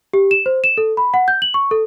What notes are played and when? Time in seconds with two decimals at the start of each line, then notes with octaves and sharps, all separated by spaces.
0.13 G4
0.31 E7
0.46 C5
0.64 E7
0.78 A4
0.97 B5
1.14 F#5
1.28 G6
1.42 F#7
1.54 C#6
1.71 A4